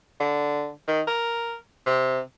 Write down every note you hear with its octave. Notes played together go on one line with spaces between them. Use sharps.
D3
D#3
A#4
C3